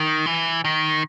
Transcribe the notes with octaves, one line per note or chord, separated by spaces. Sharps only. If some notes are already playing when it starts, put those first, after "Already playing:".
Already playing: D#3
E3
D#3